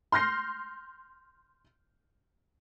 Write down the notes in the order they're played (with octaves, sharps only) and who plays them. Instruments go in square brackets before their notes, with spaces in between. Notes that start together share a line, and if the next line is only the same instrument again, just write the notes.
[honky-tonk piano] C6 F6 G6 A#6 C7